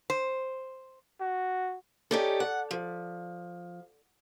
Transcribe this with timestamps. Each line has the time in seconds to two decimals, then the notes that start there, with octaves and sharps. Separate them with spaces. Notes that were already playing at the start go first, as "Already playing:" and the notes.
0.10 C5
1.21 F#4
2.11 C#4 D#4 G4 A4 D5
2.40 F#5
2.71 F3